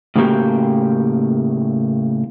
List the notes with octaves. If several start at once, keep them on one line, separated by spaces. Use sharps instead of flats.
A2 C#3 A3 A#3 F#4 G4